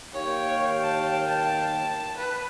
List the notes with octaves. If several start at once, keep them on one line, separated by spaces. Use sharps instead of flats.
D#2 C#5 F5 G5
A5
A5
B4